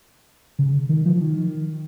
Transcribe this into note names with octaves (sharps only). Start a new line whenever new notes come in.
C#3
D#3
F3
D#3